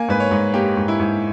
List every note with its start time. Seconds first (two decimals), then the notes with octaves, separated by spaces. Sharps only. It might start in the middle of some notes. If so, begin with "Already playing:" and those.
Already playing: A#3 G#5
0.08 G#2 B4
0.20 C#5
0.31 G#2
0.53 A#3 G4
0.77 G#2
0.88 E4
0.99 G#2